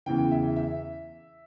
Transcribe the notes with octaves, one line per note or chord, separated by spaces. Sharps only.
E2 C#3 E3 G5
E5
E5